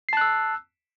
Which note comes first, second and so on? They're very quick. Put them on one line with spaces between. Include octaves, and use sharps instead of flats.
C7 A5 F#6 E6